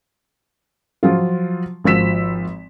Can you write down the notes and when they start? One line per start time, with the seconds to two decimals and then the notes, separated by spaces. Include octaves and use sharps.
1.03 F3 F#3 F4
1.84 G#1 F3 F#4 E6 B6 E7